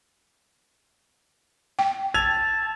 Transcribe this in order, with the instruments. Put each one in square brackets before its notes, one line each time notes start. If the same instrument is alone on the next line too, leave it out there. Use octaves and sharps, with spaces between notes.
[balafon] G5
[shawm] A5 [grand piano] E6 G#6 F7